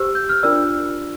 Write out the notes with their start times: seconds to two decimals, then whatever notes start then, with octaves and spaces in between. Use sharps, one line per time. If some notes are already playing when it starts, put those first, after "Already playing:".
Already playing: G4 C5 E6
0.15 G6
0.29 F6
0.43 D4 F4 A#4 D5 E6